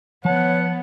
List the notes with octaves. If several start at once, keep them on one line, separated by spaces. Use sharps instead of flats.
F3 B3 C#5 F#5 A5